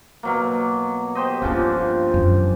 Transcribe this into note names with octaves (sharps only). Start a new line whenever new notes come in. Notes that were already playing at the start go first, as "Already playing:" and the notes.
B2 F#3 A#3
G4 C5 D#5
G2 C#3 F3 A#3 D4
F#2 D#3